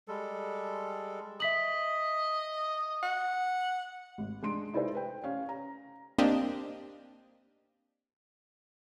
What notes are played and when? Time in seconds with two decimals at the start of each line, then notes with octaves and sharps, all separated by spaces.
0.08 G3 G#3 A4
1.40 D#5 E5 B6 F#7
3.03 F#5
4.18 G#1
4.42 G#3 D4 C6 D7
4.73 D#4 E4 A4 B4 C5 E5
4.95 B4 G5
5.24 C#4 F5
5.49 A#5
6.18 A#3 C4 D4 G4 D#5